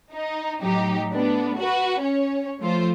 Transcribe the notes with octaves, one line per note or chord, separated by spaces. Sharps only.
D#4
A2 F#3 D#4 G4
A3 B3 D4
F#4 B4
C#4 C#5
F3 A3 F4 C5